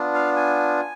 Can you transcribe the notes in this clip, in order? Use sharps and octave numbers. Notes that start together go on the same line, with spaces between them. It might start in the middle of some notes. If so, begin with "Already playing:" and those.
Already playing: B3 D4 F4
F5
G#5